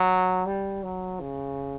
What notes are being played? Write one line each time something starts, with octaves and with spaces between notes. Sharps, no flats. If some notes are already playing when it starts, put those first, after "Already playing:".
Already playing: F#3
G3
F#3
C#3